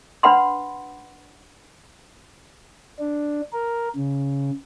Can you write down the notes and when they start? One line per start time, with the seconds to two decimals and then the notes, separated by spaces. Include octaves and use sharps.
0.23 D4 B4 F#5 B5 C6
2.99 D4
3.53 A#4
3.96 C#3